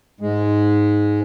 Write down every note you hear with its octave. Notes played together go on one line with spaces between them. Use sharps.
G#2 G#3